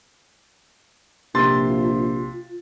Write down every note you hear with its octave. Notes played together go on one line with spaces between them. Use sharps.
A#1 C3 C6 A6
F4